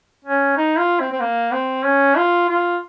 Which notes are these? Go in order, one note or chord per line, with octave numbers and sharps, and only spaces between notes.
C#4
D#4
F4
C4
C4
A#3
C4
C#4
F4
F4